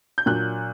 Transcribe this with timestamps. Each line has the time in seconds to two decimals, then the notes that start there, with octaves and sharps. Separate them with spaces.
0.18 G6
0.26 A#2 F#3 A#3 D4 F#6